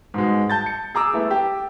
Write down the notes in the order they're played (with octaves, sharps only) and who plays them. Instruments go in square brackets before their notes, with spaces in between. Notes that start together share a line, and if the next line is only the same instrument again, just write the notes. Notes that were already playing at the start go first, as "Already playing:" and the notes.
[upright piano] G#2 B2 G#3
A5 G6 A6
C#7
G#4 A#5 D6 E6
A3 B3 E4
G4